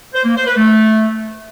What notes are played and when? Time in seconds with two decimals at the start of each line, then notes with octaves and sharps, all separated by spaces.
0.14 C5
0.25 A#3
0.36 C5
0.46 B4
0.57 A3